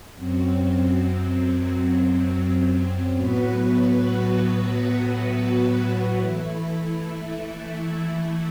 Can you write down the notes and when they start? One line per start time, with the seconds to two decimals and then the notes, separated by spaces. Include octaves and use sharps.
0.15 F#2 F#3 C4
3.15 A2 F#3 B3 F#4 B4
6.17 E3 A3 E4